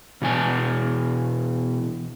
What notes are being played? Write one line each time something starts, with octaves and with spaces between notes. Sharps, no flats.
B2 E3 G#5